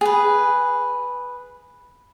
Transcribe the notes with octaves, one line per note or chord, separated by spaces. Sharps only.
G#4 B4